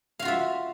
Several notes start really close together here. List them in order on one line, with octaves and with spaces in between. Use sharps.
F5 F#4 F4 E5